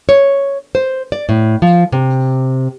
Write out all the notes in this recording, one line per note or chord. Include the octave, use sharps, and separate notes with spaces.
C#5
C5
D5
A2
F3
C3